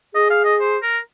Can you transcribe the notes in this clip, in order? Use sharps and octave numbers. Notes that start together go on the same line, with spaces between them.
G#4 D#5
F5
D#5
C5
A#4